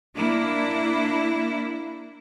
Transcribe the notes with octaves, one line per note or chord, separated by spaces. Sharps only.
A#3 D4 E4